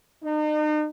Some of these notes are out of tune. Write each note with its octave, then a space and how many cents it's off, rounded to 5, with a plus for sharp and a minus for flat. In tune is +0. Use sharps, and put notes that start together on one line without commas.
D#4 -40